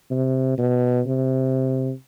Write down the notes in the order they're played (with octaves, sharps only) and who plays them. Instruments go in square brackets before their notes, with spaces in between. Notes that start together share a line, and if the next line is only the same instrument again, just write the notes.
[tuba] C3
B2
C3